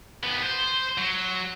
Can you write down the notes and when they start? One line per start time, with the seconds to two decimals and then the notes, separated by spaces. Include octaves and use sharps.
0.23 D#2 B3
0.43 C5
0.98 F#3